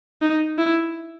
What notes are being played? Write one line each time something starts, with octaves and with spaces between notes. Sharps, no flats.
D#4
E4